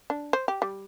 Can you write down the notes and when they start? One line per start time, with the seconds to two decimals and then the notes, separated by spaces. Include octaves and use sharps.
0.10 D4
0.33 C5
0.48 G4
0.62 G3